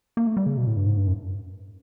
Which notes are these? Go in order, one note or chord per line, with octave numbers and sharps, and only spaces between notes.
A#3
A3
G3
C#3
B2
A2
G2
G#2
G2
F#2